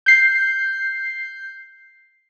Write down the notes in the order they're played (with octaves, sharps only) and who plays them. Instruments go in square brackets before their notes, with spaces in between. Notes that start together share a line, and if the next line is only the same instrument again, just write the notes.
[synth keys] G6 C7